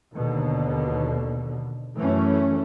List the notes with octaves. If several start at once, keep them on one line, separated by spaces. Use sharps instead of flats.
D#2 B2 D3
F#2 E3 A3 C#4